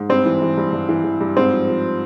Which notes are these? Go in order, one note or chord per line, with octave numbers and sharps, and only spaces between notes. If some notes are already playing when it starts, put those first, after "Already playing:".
Already playing: G#2
G2 C4
E3
E3
G2
G2
E3
E3
G2
G#2 C4
F3
F3